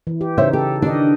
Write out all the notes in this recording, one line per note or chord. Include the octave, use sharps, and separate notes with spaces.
E3
G4
C#3 D#4 C5 C#5 E5
G4 A4
D#3 D4 G4 D#5